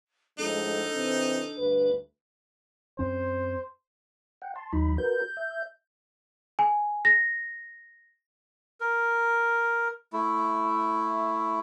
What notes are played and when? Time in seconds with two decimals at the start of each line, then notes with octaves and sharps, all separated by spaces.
0.39 A2 F3 G#3 D4 D#4 A4
0.94 C3 E3 C4
1.57 D2 G2 B4
2.99 F#2 C4 C#4 C5
4.42 F#5 G5
4.56 A5 C6
4.73 D#2 F#3 D#4 B5
4.98 F#4 A#4 B4 G6
5.37 E5
6.59 G#5
7.05 A#6
8.81 A#4
10.13 A3 E4